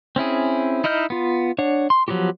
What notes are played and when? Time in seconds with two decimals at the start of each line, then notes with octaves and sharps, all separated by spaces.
0.16 C4 C#4 E4 G#4
0.84 D#4 E4 D#5 F6 G6
1.10 B3 F4
1.58 D4 C#5 F#5
1.90 C6
2.08 F3 F#3 B3 F#4 G4